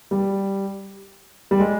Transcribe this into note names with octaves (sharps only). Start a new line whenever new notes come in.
G3
G3
G#3